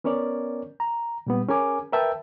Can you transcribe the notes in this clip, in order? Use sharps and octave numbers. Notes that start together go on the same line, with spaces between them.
B3 C#4 A#4 C#5 D5
A#5
A#2 G3 B3
C#4 G#4 A#4 G#5 D6
A#4 B4 E5 G5 A5 E6